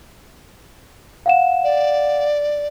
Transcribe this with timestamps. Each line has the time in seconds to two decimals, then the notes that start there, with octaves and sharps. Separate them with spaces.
1.26 F5 F#5 E7
1.64 D5